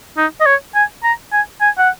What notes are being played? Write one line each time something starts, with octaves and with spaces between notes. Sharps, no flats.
D#4
D#5
C#5
G#5
A#5
G#5
G#5
F#5